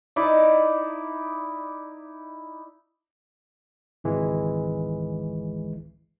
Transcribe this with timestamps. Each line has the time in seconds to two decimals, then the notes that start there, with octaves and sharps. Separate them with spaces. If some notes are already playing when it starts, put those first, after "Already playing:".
0.16 D#4 E4 D5
4.04 G#1 C#2 E3 G#3